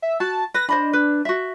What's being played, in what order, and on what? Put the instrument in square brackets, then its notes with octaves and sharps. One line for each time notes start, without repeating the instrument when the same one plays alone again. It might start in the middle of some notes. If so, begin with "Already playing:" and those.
[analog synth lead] E5
[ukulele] F#4 [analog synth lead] A5
[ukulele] B4 [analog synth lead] A#6
[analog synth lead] D4 [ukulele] C5 D#5 B5
[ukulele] B4
F#4 E5